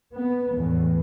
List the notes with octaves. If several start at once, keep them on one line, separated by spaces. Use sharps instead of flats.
B3
E2 A2